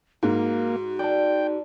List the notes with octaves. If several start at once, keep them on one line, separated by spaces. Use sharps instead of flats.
G#2 A#3 F#4
D5 G5 A5